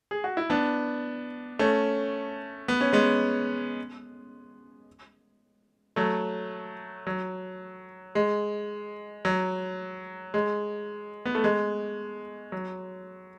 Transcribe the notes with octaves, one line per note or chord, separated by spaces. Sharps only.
G#4
F#4
E4
B3 D4
A3 C#4
B3
C#4
G#3 B3
F#3 A3
F#3
G#3
F#3
G#3
B3
A3
G#3
F#3